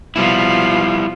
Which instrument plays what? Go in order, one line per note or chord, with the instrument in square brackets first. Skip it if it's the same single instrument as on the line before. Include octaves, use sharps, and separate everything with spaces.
[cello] B2 F3 [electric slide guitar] G3 E4